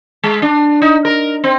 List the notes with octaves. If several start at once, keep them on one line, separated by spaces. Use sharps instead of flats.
G#3
D4
D#4
A#4
C4